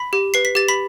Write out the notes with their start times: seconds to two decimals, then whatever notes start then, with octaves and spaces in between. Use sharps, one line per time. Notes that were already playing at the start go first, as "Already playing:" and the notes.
Already playing: B5 B6
0.13 G4
0.34 B4 C7
0.45 B6
0.55 G4 A6
0.68 B5 B6